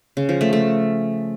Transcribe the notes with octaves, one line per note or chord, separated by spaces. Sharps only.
C#3
F3
A3
A3